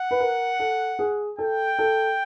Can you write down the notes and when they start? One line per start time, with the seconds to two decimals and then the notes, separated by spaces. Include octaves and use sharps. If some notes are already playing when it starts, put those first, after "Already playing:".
Already playing: F#5
0.11 B4
0.20 A#4
0.60 A4
0.99 G#4
1.38 A4 G5
1.79 A4